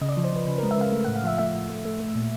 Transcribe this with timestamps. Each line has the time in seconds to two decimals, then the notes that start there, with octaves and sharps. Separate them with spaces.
0.01 C#3 D#5
0.09 D5
0.12 F3 D#5
0.24 C5
0.33 F3 B4
0.47 C#3 B4
0.58 G#3 A#4
0.71 E5
0.78 C#3 F5
0.93 A3
1.04 A2 F#5
1.16 F5
1.24 F3 E5
1.38 A3 E5
1.54 A2
1.70 A3
1.85 A3
2.00 A3
2.15 A#2